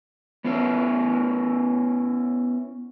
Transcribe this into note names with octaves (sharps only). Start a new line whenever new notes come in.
B3 C#4 E4 C5